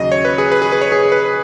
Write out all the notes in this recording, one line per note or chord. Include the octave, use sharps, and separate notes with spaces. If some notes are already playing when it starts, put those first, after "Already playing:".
Already playing: D#2 C#3 F#3 D#5
C#5
B4
G#4
B4
G#4
B4
C#5
G#4
B4